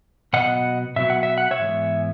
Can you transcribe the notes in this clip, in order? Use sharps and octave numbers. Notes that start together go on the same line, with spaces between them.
B2 F#3 B3 D#5 F#5
B2 F#3 B3 E5
F#5
E5
F#5
C#5 E5
G#2 E3 G#3 B3